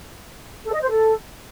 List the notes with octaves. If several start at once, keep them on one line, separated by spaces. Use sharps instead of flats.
A4
D#5
C5
A4